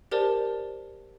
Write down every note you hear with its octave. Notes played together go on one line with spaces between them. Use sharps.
G4 A#4 C5 D5 A5